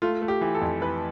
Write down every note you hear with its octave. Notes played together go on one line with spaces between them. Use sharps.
A3 F4
A3
G4
E3
A4
F2
E3 B4